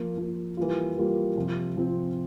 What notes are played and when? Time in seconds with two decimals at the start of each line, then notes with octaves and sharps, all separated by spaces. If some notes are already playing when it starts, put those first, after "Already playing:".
Already playing: F3 A#3 F4
0.18 F3 A#3 F4
0.57 E3 G3 A#3 F4
0.97 E3 G3 A#3 F4
1.37 C3 F3 C4
1.76 C3 F3 C4